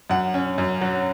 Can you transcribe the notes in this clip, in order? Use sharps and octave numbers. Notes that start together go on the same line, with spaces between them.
F#2 F#5
C#4
F#2
F#3